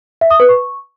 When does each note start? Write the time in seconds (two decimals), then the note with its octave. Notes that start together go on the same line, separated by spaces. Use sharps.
0.21 E5
0.31 D#6
0.40 B4
0.49 C#6